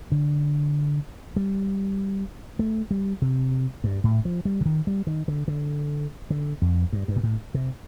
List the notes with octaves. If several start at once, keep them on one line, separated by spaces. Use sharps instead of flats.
D3
G3
A3
G3
C3
G2
A2
F3
G3
D3
D#3
G3
D#3
D3
D3
D3
F2
G2
G2
A#2
A2
C3